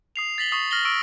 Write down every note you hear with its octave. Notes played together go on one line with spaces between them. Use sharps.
D#6 C7 F7
A6 B6 F#7 G7
C#6 D#6 C7
F6 A#6 F#7 G7
C#6 E6 D7